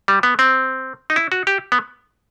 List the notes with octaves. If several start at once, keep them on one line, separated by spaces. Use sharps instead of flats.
G3
B3
C4
D#4
E4
F#4
G4
B3